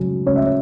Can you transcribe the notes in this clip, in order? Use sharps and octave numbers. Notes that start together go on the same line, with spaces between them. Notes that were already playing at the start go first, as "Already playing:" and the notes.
Already playing: C#3 F#3 C#4
C#3 C#5
E5
C#5